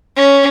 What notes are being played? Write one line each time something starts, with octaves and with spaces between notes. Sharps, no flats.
C#4